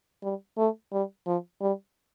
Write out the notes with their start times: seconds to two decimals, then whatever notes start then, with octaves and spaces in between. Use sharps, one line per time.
0.23 G3
0.58 A3
0.92 G3
1.26 F3
1.61 G3